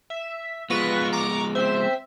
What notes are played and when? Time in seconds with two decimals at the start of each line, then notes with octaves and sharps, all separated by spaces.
0.10 E5
0.70 F3 G#3 B3 F4 B4 C#6 A#6
1.13 A#5 C#6 D6
1.55 C4 C5 E5